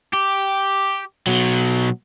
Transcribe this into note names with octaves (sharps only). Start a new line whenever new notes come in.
G4
B2 F#3